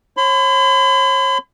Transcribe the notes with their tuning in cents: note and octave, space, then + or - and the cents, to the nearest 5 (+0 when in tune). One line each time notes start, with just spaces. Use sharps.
C#5 -40 B5 +45